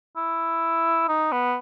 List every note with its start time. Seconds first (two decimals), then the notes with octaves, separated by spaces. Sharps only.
0.16 E4
1.08 D#4
1.32 B3